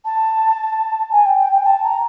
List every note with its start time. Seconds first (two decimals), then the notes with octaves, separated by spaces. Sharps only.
0.05 A5
1.12 G#5
1.26 G5
1.39 G5
1.52 G5
1.66 A5
1.84 A#5